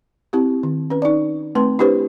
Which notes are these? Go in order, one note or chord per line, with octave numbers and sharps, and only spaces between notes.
C4 E4 G4
D#3
C#4 B4
D#4 D5
A3 C4 B4 C6
D4 E4 G4 B4 C5